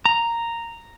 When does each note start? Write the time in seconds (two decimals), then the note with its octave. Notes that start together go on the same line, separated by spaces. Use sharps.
0.05 A#5